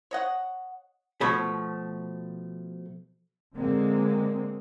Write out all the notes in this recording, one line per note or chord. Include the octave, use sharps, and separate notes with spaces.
C#5 D#5 F#5
B2 F3 A3 C#5 B5
D3 G#3 A#3 C4